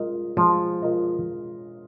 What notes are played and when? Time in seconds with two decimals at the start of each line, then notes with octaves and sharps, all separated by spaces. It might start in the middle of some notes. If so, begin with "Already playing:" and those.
Already playing: G#3 F4 A#4 D#5
0.37 F3 G#3
0.82 F4 A#4 D#5